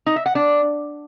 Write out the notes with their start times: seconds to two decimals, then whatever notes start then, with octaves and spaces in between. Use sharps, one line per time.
0.06 D#4
0.16 E5
0.26 F#5
0.35 D4